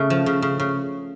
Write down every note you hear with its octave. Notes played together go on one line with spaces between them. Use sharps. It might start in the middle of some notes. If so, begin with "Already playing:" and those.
Already playing: C#3 A3
F3
C#3
C#3
C#3